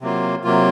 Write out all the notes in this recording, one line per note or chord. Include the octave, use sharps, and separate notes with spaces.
C3 F#3 A#3 F4
C3 F#3 A#3 F4